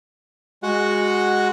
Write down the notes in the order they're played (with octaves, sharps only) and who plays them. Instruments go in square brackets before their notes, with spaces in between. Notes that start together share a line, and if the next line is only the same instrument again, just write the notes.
[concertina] G#3 F#4 F#5